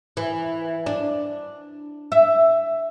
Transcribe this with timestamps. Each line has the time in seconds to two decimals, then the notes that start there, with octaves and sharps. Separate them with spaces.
0.17 E3
0.86 D4
2.12 E5